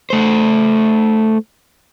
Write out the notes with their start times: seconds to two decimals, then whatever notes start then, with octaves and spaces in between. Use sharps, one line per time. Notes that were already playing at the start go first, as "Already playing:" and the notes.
0.10 A3 C5